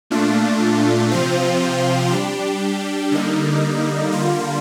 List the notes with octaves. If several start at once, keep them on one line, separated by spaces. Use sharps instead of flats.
A#2 A3 D4 F4
C3 F3 C4 F4 C5
G3 D4 G4
D3 G3 A#3 D#4
D3 G3 A#3 F4